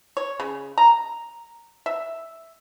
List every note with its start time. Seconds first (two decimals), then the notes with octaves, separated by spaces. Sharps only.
0.17 C#5
0.40 C#3
0.78 A#5
1.86 E5